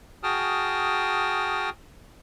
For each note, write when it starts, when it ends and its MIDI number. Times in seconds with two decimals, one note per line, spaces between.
0.23 1.70 66
0.23 1.70 68
0.23 1.70 79
0.23 1.70 81
0.23 1.70 87
0.23 1.70 89